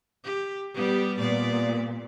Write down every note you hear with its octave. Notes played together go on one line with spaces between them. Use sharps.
G4
G3 B3 G4
A#2 B3 D5